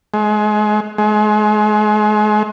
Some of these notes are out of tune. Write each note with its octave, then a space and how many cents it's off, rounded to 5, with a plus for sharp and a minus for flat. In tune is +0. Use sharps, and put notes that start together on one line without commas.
G#3 +30
G#3 +35